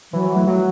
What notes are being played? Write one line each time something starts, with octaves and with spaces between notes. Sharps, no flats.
E3 F#3
A3
F#3